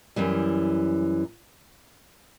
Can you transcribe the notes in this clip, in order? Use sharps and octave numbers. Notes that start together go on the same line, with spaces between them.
F#2 E3 G3